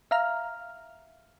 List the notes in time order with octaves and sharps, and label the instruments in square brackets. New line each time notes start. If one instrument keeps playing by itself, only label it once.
[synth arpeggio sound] E5 F5 A#5 F6